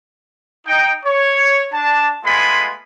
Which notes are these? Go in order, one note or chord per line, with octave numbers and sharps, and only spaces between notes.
D#4 G5
C#5
D4 A5
G#3 A3 B3 F4 G#5 B5